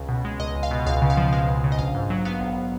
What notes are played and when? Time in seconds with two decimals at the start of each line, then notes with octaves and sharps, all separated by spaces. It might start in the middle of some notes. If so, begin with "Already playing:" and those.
Already playing: C#2 C#3
0.09 B2
0.25 G#3
0.40 C#2 D#5
0.55 C#2
0.63 F5
0.71 B2
0.86 C#2 F5
1.02 C#3
1.10 F5
1.17 F3
1.33 G#3 F5
1.48 C#2
1.64 C#3
1.72 D#5
1.79 A#1 F5
1.94 G#2
2.10 F#3
2.25 B3 F5
2.41 A#1